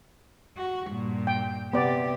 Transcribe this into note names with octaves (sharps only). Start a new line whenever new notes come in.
F#4
G2 A#2
G5
C3 B3 G4 D5